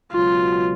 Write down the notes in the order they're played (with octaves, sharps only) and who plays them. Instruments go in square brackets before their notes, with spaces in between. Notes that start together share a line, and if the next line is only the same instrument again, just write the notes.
[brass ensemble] C#2 B2 F#3 [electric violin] F4